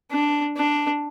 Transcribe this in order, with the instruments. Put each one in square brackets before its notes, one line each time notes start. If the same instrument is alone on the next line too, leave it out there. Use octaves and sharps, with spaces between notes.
[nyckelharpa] D4
D4